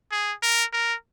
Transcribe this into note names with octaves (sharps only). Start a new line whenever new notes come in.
G#4
A#4
A#4